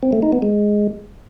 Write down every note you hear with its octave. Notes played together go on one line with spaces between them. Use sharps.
C4
A3
D#4
B3
G#3